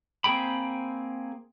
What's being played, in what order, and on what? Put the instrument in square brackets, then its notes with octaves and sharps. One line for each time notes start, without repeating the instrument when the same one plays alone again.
[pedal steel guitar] A#3 C4 G#4 G5 B5